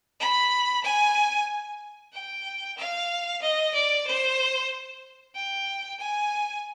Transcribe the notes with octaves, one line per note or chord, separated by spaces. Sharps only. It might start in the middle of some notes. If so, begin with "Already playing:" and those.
B5
G#5
G5
F5
D#5
D5
C5
G5
G#5